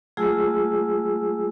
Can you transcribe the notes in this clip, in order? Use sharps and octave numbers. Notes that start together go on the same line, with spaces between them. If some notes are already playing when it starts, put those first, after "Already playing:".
F#3 A3 F4 G#4 G#5 E6